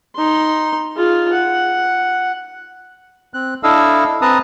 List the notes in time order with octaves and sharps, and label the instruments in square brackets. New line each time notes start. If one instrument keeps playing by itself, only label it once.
[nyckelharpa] D#4 C6
F4 G#4
F#5
[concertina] C4 F#6
D4 E4 A4 D#5 F5 E6
C4 B4 A5 A#5 D#6